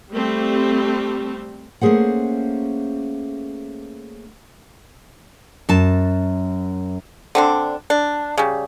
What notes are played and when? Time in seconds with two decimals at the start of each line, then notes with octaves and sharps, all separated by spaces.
0.12 G3 A3 C4
1.81 A3 A#3 C#4 G#4 C5 F#5
5.69 F#2 A5
7.35 D3 C4 D4
7.90 D4
8.38 C#3 G3